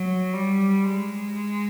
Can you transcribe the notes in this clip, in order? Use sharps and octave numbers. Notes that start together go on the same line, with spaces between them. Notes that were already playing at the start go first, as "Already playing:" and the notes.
Already playing: F#3
G3
G#3